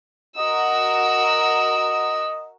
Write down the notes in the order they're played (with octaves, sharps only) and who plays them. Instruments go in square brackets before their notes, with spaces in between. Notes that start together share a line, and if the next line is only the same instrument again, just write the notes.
[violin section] F#4 A#4 E6 [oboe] D#5